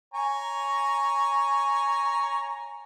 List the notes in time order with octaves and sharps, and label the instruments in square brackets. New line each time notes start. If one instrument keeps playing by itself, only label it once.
[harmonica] C#5 G#5 A#5